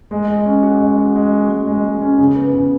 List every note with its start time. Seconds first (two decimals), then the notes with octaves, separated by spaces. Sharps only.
0.11 G#3
0.28 G#3
0.45 C#4
0.63 F#4
0.81 G#3
0.98 F#4
1.15 G#3
1.32 F#4
1.50 G#3
1.67 G#3
1.84 G#3
2.01 C#4
2.19 C#3
2.36 B3
2.54 C#3